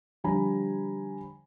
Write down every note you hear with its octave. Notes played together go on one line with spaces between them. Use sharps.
D3 F3 G3 G#5 A#5 B5